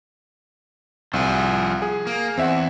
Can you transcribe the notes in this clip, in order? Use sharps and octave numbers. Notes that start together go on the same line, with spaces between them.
C2 F3 G#4
G#4
A#3
E2 C4 E5 F#5